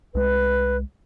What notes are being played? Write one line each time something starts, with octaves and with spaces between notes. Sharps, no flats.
C2 G#3 B4